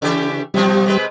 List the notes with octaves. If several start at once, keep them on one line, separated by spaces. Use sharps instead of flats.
C#3 E3 G4
B2 F3 G3 C4
C3 G#3 B4